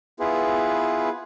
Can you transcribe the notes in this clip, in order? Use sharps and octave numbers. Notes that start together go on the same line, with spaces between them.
B3 E4 F4 G#4 B4